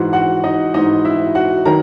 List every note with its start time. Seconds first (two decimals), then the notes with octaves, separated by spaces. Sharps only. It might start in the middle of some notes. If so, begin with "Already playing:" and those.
Already playing: G#2 E3 F#4 F#5
0.13 F#4 F#5
0.44 D#4 D#5
0.74 G#2 E3 D#4 D#5
1.05 E4 E5
1.35 F#4 F#5
1.65 D#3 F#3 A#4 A#5